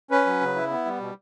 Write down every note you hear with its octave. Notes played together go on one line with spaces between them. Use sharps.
C#4 B4
F#3
C#3
E4
B3
G3
B2